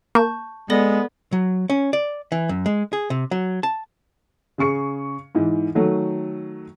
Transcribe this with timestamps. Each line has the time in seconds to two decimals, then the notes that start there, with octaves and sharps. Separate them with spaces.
0.15 A#3 A5 C#6 G6
0.70 G#3 B3 A4 D5 A#6
1.32 F#3
1.70 C#4
1.93 D5
2.32 E3
2.49 F#2
2.66 G#3
2.93 G#4
3.10 C3
3.31 F#3
3.63 A5
4.58 C#3 G#4 C#6 C#7
5.35 G#2 E3
5.75 D#3 F#3 A3